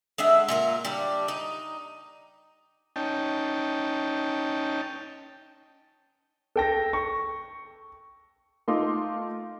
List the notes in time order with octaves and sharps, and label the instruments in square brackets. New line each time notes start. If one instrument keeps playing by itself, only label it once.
[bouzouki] G#3 D4 E5 F#5
A#2 F4 A#4
G3 D4
D#4
[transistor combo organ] C#4 D#4 G5 A5
[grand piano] A4 G5 A#6
C#6
[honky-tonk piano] A3 D#4 F4 C6 D6